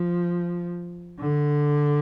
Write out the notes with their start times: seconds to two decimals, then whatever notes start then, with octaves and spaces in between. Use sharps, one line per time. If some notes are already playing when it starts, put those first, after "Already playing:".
Already playing: F3
1.20 D3